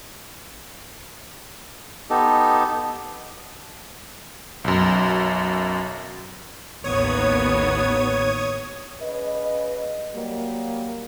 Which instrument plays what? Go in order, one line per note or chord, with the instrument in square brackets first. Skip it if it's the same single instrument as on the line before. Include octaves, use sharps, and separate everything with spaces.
[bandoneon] B3 D#4 G4 A4
[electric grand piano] B1 F#2
[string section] A1 D#2 B3 [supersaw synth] C#5 D#6 G#6
[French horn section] C#3 B4 D#5
F#3 G3 A#3